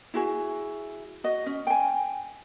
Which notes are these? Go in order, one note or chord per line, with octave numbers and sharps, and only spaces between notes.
E4 F#4 G#4
F#4 D#5
C#4
G5 G#5